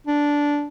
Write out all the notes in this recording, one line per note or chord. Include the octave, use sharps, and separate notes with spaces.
D4